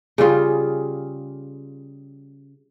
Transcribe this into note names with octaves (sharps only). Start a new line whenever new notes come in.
C#3 G3 F4 G#4